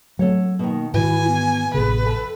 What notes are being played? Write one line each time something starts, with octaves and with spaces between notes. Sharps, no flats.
F#3 A3 C4 A4 C#5 F#5
B2 D#3 A#3
G#2 D#3 E3 E4 F#4 B4 G#5
B3
A1 C3 B3 G#4 A4 B4
F2 A4 A5